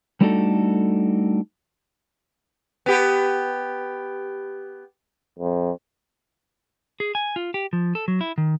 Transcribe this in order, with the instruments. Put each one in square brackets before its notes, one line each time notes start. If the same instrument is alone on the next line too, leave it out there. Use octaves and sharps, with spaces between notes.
[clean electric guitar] G3 A3 D4 D#4 F#4 A4
[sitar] B3 G4
[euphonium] F2
[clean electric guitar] G#4
G#5
F4
G4
F3
A4
F#3
E4
D#3